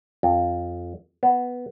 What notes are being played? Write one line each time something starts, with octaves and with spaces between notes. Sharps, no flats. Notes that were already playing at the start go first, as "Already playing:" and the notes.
F2
B3